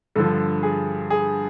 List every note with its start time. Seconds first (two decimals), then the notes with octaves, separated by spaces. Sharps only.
0.15 G2 D3 F3 A4
0.63 G#4
1.10 G#4